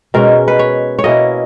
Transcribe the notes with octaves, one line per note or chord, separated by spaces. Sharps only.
B2 G#3 C#4 A#4
B4
C#5
C#5
B2 A#3 C#4 E4 D#5